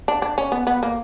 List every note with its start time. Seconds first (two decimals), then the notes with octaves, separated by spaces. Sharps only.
0.08 D4
0.22 D4
0.38 C#4
0.52 B3
0.67 B3
0.83 A#3